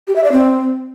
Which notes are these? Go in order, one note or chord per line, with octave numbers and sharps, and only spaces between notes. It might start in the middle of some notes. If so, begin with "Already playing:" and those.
G4
E5
D5
C4